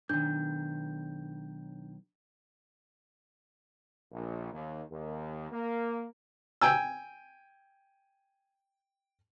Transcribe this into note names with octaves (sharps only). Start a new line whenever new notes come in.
B1 D#3 D4 G6
A#1
D#2
D#2
A#3
G5 G#5 E6